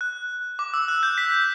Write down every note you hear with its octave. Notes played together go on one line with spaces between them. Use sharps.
F#6
D6
E6
F#6
G6
B6